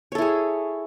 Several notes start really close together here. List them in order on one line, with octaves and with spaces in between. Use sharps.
C#5 A4 E4 G#4